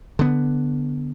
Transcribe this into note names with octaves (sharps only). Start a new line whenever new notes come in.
D3 B3